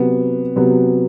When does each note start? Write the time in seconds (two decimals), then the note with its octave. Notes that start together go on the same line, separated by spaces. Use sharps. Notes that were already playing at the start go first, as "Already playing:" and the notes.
Already playing: C3 F#3 B3
0.56 C3 F#3 B3